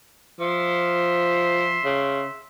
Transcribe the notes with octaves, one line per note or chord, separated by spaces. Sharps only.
F3 E5 C6
C#3